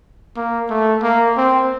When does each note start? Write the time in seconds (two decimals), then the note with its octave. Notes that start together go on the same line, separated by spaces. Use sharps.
0.37 A#3
0.70 A3
1.03 A#3
1.37 C4